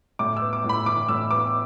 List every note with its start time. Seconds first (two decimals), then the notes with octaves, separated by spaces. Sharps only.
0.19 A2 D6
0.37 E6
0.42 B3
0.53 D6
0.64 A2
0.69 B5
0.86 E3 D6
1.09 A2 E6
1.31 B3 D6